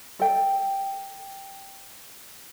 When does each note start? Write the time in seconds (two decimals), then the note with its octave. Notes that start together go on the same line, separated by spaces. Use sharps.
0.19 A4 G5